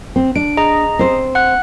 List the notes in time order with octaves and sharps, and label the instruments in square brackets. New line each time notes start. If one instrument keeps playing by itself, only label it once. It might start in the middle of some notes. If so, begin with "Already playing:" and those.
[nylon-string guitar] C4
[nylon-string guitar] D4 [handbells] D7
[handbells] G#4 D#5 A#5
[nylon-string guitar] C4 C5
[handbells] F#5 F#6